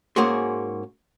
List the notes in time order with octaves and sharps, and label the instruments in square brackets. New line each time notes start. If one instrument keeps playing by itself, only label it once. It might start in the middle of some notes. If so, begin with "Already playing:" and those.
[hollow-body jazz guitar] G#2 A#3 C#4 F#4 G#4 C6